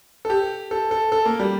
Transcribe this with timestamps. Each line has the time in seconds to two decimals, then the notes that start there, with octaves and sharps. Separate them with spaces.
0.25 A4
0.30 G4
0.71 A4
0.91 A4
1.12 A4
1.26 A#3
1.39 G3